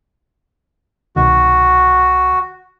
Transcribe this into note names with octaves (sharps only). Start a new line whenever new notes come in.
C2 B2 D#3 F#4